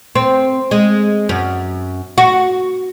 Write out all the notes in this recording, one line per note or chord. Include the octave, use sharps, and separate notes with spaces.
C4
G#3
F#2
F#4